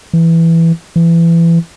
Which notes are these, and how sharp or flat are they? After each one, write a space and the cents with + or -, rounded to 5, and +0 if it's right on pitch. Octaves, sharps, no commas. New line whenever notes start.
E3 +5
E3 +25